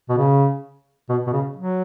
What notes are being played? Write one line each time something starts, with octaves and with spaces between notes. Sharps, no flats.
B2
C#3
B2
B2
C#3
F#3